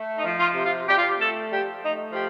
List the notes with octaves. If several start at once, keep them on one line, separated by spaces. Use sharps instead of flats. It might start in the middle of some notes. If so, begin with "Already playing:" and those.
Already playing: A3
D#4
F3
F4
C3
F4
C3 G4
F4
G4
A3 A4
F3 G4
A3 D#4
F3 G4